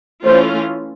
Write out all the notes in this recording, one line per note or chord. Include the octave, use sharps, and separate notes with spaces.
E3 A3 C#4 F4 C5